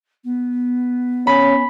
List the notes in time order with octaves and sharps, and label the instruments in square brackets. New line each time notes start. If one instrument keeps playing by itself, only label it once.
[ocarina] B3
[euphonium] C#4 [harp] B5